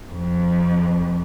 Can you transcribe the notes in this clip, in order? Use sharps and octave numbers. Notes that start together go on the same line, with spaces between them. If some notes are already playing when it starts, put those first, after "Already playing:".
F2